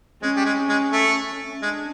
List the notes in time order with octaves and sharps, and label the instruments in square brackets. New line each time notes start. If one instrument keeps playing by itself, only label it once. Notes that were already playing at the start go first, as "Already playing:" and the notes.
[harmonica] G#3 [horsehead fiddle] C#4
[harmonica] G3
G#3
G#3
A3
[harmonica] G#3 [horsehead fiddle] D4